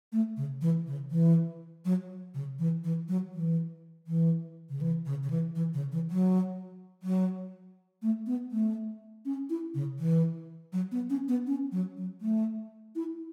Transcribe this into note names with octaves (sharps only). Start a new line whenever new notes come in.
A3
C#3
E3
C#3
E3
F#3
C#3
E3
E3
F#3
E3
E3
C#3
E3
C#3
C#3
E3
E3
C#3
E3
F#3
F#3
A3
B3
A3
C#4
E4
C#3
E3
F#3
B3
C#4
B3
C#4
F#3
F#3
A3
E4